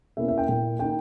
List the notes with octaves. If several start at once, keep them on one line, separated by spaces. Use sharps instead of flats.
B2 A#3 C#4 E4 E5
E5
G5
A#2 A#3 E4
D#3 A#3 D#4 G5